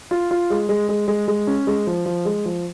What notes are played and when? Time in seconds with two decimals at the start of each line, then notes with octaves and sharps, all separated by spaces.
0.11 F4
0.31 F4
0.50 G#3
0.69 G#3
0.89 G#3
1.08 G#3
1.28 G#3
1.47 C#4
1.67 G#3
1.87 F3
2.06 F3
2.25 G#3
2.45 F3